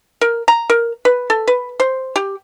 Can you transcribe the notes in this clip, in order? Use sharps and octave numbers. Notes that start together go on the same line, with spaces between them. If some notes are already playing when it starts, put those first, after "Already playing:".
A#4
A#5
A#4
B4
A4
B4
C5
G4